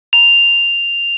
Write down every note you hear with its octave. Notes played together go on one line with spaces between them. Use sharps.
F7